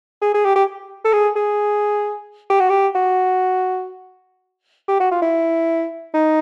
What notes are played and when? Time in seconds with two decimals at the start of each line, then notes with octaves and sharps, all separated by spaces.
0.22 G#4
0.34 G#4
0.45 G4
0.56 G4
1.04 A4
1.13 G#4
1.36 G#4
2.50 G4
2.60 F#4
2.69 G4
2.95 F#4
4.88 G4
5.00 F#4
5.11 F4
5.22 E4
6.14 D#4